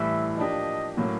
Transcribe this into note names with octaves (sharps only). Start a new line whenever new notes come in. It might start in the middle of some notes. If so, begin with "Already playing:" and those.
Already playing: A2 E3 G3 E5
F3 A#3 D4 G4 D#5
A2 F#3 A#3 C#4